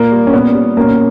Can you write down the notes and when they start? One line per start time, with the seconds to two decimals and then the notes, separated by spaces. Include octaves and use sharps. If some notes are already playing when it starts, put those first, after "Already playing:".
Already playing: A#2 A#3
0.12 G3
0.27 C#4
0.33 A#2 B3
0.55 G3
0.77 B2 A#3 C#4